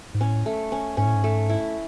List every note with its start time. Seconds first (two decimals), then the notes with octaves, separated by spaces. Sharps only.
0.14 G#2
0.20 A2 C#4
0.46 A3
0.72 C#4
0.97 G#2 C#4
1.05 A2
1.15 G#2
1.24 A3
1.49 E4